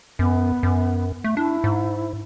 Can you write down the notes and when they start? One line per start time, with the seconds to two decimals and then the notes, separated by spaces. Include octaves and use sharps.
0.19 F#2 B3
0.63 F#2
1.24 A3
1.37 D4 E4
1.64 G#2